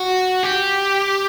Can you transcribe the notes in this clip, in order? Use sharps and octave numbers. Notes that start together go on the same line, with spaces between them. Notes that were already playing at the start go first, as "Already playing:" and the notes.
Already playing: F#4
G4